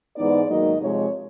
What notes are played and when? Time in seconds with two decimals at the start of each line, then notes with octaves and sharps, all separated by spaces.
0.16 G#2 E3 G#3 B3 D#4 D5
0.49 G#2 D#3 F#3 A#3 D#4 D#5
0.80 C3 F3 G#3 C#5